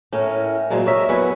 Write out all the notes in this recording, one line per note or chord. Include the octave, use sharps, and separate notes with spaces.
A2 C#4 A#4
A#2 F3 F#3 G#3
C3 A#4 C#5 D#5 E5
E2 F#3 B3 F#4 B4 G#5